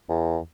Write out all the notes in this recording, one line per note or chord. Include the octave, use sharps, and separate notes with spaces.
E2